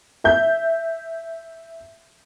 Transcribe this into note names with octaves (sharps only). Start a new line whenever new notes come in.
E5 G6